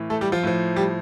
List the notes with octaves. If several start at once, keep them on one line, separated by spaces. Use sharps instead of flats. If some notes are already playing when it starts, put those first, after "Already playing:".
Already playing: A2 E3
A3 A4
G3 G4
F3 F4
A2 F3
G3 G4